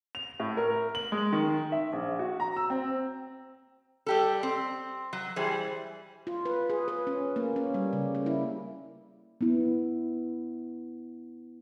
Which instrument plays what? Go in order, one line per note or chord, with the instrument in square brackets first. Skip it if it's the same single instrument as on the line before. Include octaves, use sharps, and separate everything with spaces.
[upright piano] F7
A2
A#4
F#7
G#3
D#3
E5
A#1
F#4
A#5
E6
C4
[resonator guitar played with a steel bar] G3 G4 A4
C4
F#3
E3 G3 G#4 C5
[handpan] F4
B4
G#4
B4
C#4
A#3
C#4
G3
C#3
A#3
E4
B3 E4